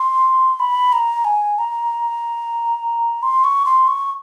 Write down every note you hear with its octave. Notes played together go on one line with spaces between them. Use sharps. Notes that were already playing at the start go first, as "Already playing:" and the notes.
Already playing: C6
B5
A#5
G#5
A#5
C6
C#6
C6
C#6